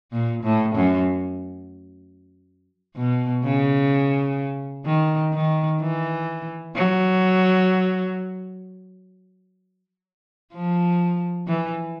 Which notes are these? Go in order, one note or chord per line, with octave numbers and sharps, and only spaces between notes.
A#2
A2
F#2
B2
C#3
D#3
D#3
E3
F#3
F3
E3